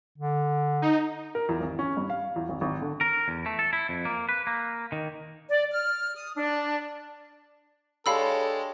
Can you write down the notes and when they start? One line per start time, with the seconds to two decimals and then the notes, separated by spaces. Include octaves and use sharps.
0.18 D3
0.82 D#4
1.35 A#4
1.49 E2
1.60 G#1
1.79 C#4
1.97 G2
2.10 F5
2.36 E2
2.49 G#1
2.61 G#1
2.81 D3
3.01 A#4
3.28 E2
3.46 A3
3.59 A4
3.73 E4
3.89 F2
4.05 A#3
4.29 B4
4.47 A#3
4.92 D#3
5.49 D5
5.70 F6
6.15 D#6
6.36 D4
8.06 G#3 D4 G4 A4 C#5 F5 B5 E6